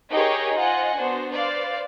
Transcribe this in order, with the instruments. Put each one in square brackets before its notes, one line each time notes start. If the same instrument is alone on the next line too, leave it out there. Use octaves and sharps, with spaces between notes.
[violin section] D#4 G4 G#4 A#4 C#5 D#5
F4 C5 D#5 F#5 G#5
B3 D4 F#4 C5
B4 C5 D5 F5